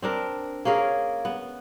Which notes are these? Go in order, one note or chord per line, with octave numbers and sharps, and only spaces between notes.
C4 D4 A#4
A#3 C#4 G#4 A#4
B3